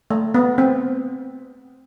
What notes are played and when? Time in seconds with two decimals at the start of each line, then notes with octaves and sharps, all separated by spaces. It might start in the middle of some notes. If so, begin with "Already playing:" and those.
0.10 A3
0.34 B3
0.58 C4